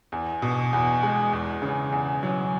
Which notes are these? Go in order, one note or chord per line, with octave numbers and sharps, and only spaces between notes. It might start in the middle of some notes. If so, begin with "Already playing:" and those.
E2
B2
E2
G#3
E2
C#3
E2
F#3